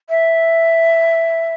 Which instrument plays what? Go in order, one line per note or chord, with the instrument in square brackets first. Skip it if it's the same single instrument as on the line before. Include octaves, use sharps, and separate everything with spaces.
[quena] E5